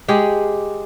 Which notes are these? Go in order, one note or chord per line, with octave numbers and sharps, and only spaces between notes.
G#3 G4 G#4